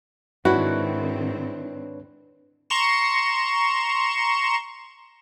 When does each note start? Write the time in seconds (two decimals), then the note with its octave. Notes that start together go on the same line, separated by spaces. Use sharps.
0.45 G#2 D#3 C4 D4 E4 F#4 B4 C#5
2.70 A#5 C6 C#6 C#7 E7